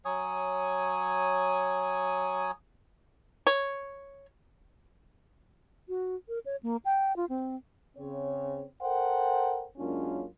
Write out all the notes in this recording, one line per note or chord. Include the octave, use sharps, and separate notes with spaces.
F#3 C#5 G#5 D#6
C#5
F#4
A#4
C#5
A#3
G5
F4
C4
C#3 C4 C#5
A4 A#4 C5 F#5 G5
F#2 G#3 A#3 C#4 D4 F4